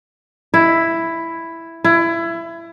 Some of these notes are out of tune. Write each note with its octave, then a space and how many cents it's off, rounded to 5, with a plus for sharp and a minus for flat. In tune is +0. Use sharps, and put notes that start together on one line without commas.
E4 +5
E4 +25